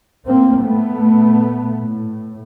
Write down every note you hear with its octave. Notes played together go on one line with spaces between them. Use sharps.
A2 A#3 C4
A3 B3
A#2
A2